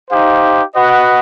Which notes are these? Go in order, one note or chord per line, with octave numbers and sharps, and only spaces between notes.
D#4 G4 C5 F5
F#4 B4 D#5 F#5